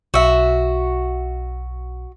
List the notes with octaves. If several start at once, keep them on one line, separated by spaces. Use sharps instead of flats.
B1 F#4 E5